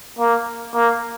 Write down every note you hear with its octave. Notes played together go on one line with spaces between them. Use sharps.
A#3
A#3